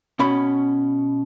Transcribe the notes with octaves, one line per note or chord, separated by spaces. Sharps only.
B2 C#4 B5